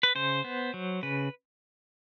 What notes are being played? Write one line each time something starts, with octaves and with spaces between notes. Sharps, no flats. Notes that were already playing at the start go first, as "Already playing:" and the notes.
B4
C#3 C5
B3
F#3
C#3 B4